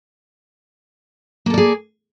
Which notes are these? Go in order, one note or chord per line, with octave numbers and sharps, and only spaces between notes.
A#3 G#4 A4 D5